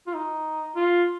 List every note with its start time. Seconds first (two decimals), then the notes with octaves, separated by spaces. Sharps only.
0.07 F4
0.14 D#4
0.76 F4